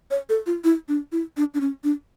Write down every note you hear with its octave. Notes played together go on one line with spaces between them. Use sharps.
C#5
A4
F4
E4
D4
E4
D4
D4
C#4
D4